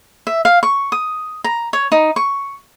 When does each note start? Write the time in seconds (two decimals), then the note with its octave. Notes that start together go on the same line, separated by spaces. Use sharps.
0.27 E5
0.45 F5
0.63 C#6
0.92 D#6
1.44 A#5
1.73 C#5
1.92 D#4
2.16 C#6